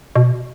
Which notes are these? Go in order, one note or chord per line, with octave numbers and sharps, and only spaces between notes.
B2